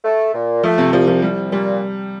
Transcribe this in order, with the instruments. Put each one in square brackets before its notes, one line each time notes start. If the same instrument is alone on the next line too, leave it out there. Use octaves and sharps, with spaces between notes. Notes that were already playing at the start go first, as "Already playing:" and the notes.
[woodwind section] A3
A#2
[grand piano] F3 [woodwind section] A3
[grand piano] C3
[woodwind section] C2 [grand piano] F3
[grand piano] F3
[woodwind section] C2 [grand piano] G3
[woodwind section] A#2 [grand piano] G3